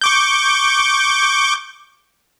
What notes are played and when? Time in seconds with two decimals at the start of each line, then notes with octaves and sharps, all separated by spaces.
0.01 C#6 D6 G6